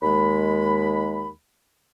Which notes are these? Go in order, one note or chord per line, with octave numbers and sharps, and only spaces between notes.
D#2 G#3 B5